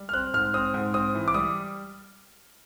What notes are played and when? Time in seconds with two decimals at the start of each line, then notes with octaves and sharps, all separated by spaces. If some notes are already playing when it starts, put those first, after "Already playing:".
Already playing: G3
0.09 F6
0.13 C4 F#6
0.34 G#2 F6
0.54 C4 D#6
0.74 G#2
0.94 C4 D#6
1.15 E3
1.28 D6
1.34 G3 D#6